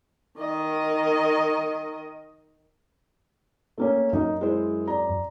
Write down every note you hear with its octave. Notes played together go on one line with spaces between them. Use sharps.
D#3 D#5
A3 A#3 C#4
F#2 D#4
G#3 E4 C5
D5 A#5